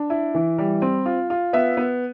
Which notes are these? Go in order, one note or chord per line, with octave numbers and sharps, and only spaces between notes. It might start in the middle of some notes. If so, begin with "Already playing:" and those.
Already playing: D4
E4
E3
G3
C4
F4
F4
B3 E5
B3